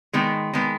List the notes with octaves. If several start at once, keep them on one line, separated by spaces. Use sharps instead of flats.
D#3 G#3 B3
D#3 G#3 B3